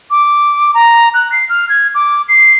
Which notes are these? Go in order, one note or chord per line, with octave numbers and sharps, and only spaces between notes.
D6
A#5
F#6
C7
F6
G#6
D6
C7